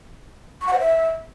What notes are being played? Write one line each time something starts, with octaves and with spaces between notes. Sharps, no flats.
C#6
F#5
C5
E5